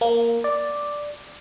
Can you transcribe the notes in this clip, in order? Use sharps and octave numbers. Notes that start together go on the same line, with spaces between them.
A#3
D5